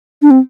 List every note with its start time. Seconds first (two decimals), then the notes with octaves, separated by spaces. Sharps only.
0.22 D4
0.31 C4